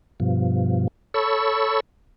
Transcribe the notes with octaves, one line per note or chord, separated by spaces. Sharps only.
G2 B2 F3
A4 C#5 B5 C#6 E6